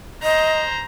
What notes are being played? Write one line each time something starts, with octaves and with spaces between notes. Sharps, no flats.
C5 D#5 A#5